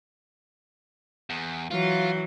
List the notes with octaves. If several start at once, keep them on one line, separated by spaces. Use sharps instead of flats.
E2
E3 F#3 F4